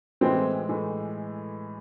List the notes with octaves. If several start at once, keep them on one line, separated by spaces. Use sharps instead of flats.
A2 E3 G#3 C4
A2 E3 G#3